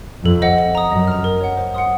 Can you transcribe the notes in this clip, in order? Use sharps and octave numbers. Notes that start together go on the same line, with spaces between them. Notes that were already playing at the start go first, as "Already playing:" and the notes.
F2 A4
C5 D#5 F#5
D#5
A#5 D#6
F#2 D#5
A#5 F6
A#4
C#5 F#5
C5
F#5 C6 D#6